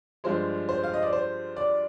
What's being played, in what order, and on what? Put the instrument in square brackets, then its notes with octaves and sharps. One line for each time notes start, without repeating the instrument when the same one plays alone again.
[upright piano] G2 F3 G#3 C5
C5
F5
D#5
D5
C5
D5